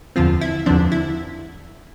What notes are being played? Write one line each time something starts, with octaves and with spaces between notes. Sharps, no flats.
E2 D3 F3 C4 F4
E4
E2 D3 F3 C4 D4
E4